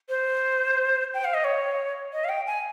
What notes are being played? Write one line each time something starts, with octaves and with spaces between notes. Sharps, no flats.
C5
G5
F5
D#5
C#5
D#5
F5
G5
G#5